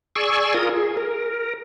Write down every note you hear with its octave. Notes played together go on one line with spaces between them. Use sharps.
G#4 D5 G#5 C#6 E6
F4 A#4 D#6
G#4
A#4